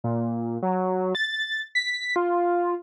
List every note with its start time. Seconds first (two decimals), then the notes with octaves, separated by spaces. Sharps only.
0.04 A#2
0.62 F#3
1.15 A6
1.75 B6
2.16 F4